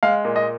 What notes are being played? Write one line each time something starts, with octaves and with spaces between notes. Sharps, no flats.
G#3 F5
A#2
D#5